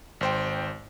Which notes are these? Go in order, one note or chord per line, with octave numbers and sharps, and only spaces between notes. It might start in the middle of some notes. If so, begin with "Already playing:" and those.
G#1 C5 G5